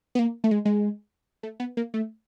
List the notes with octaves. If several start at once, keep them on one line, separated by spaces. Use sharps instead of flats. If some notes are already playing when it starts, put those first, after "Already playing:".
B3
A#3
A3
G#3
G#3
A3
B3
A#3
A3